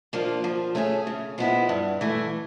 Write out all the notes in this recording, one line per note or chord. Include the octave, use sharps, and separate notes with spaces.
F3 A#3 D4
F3
A3 C#4 E4 G#4
C#3
F3 G#3 B3 E4
G2
E3 A3